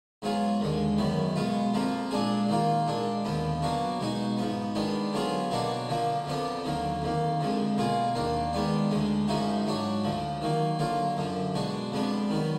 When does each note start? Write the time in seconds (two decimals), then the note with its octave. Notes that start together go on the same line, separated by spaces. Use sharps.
0.22 G#2 F#3 B3 F4 G#4
0.60 D#2 D3 G#3
0.98 F#2 D#3 F#3 B3
1.36 B2 G#3 B3 F4
1.74 F2 F3 A#3 F4
2.11 A#2 G#3 D4 G#4
2.49 D#3 A#3 F4
2.87 A#2 G#3 D4
3.24 D#2 D3 F3 B3
3.62 B2 F#3 A#3 D4 F#4
4.00 B2 G#3 D#4 F#4
4.37 G#2 F3 B3
4.75 D#3 G#3 B3 D4
5.13 D3 F#3 B3 F4 G#4
5.51 B2 F#3 A#3 D4 F#4
5.88 D3 F3 A#3
6.26 F2 D3 F3 B3 D4
6.64 D#2 D3 F#3 A#3
7.02 F2 D#3 A#3
7.40 F2 D3 F3 G#3
7.78 B2 A#3 F4 G#4
8.15 D#2 D#3 A#3 D4
8.53 D#3 G#3 B3 D4
8.91 D2 D3 G#3
9.28 F#2 F3 G#3 D#4 F#4
9.66 G#2 F#3 D4 F#4
10.04 D2 D3 F3
10.41 D#3 F#3 A#3
10.79 D3 F#3 A#3 F4
11.17 F#2 D3 F3
11.54 B2 G#3 D4 F#4
11.92 F2 F3 G#3 B3 D4
12.30 D#3 F#3 B3